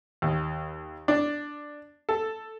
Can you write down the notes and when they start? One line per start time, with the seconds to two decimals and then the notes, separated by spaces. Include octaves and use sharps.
0.22 D#2
1.08 D4
2.09 A4